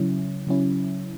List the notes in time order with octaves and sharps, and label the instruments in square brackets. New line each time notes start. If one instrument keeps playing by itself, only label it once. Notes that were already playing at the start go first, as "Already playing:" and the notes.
Already playing: [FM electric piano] C#3 F#3 C#4 E4
C#3 F#3 C#4 E4